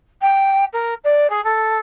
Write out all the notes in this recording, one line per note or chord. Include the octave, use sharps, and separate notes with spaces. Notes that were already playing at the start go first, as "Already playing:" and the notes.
G5
A#4
D5
G#4
A4